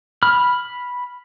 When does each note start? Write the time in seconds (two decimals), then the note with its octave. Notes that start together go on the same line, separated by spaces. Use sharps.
0.23 B5 F6